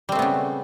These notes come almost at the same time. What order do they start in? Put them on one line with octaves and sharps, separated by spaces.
G3 C4 A3 B3 C#3